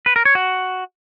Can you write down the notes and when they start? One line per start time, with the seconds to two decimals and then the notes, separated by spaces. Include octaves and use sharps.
0.06 B4
0.16 A#4
0.25 C#5
0.35 F#4